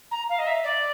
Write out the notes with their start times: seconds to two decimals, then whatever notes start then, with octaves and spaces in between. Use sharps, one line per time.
0.11 A#5
0.29 F5
0.38 D#5
0.46 E5
0.63 D5